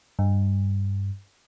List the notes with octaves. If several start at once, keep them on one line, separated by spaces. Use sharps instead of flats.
G2